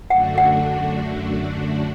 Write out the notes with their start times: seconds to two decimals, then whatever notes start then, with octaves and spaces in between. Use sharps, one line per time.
0.10 F#2 D3 A3 D4 F#4 F#5
0.38 F#5